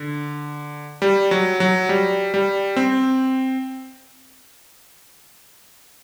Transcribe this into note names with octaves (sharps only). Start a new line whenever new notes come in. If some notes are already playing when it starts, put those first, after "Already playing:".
Already playing: D3
G3
F#3
F#3
G3
G3
C4